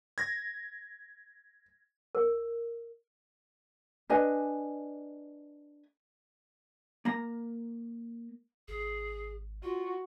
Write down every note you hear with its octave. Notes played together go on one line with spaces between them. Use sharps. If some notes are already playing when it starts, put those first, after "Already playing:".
G#6 A#6
A#4
D4 B4 D#5 G#5
A#3 A#5
G#1 G#4
F4 F#4